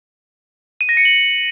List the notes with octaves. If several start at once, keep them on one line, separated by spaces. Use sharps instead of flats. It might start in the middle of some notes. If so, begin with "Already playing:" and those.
D#7
A#6
C#7
F#7